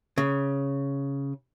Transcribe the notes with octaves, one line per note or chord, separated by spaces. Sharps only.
C#3